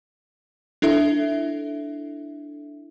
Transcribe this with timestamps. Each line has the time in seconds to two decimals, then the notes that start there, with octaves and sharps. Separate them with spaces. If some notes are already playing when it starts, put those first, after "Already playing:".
0.82 D4 E4 A4 E5